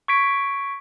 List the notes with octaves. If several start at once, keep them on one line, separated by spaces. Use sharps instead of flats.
C#6 G#6 B6 D7